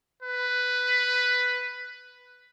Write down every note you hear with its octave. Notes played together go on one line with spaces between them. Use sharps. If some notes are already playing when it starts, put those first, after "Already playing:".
B4